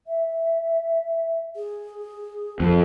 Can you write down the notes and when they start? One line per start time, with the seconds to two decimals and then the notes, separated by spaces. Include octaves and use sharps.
0.07 E5
1.56 G#4
2.60 F2 A4